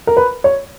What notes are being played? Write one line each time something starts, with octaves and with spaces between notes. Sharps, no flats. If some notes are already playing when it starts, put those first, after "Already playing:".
A#4
B4
C#5